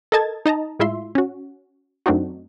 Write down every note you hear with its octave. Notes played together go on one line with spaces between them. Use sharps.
A4 A#4 D#5 A5 G#6 A6
D#4 D#5 A5 A#5
A2 G#3 E4 F4 E5 C6
C#4 F#4
F#2 A3 C4 D4 D#4 F#4